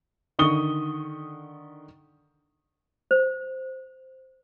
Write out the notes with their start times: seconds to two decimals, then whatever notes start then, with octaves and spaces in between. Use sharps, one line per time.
0.39 D3 D#3 C#6 D#6 G7
3.11 C5